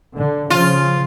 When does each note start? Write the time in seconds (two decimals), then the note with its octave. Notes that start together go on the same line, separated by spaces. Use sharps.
0.17 D3
0.50 C#3 F3 F4